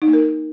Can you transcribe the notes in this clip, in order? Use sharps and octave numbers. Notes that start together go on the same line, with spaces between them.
D#4
A#3
A#4